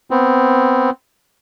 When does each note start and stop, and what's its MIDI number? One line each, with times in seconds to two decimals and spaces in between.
0.11 0.90 59
0.11 0.90 60